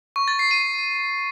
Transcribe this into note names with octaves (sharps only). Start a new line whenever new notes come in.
C#6
A6
C7
D#7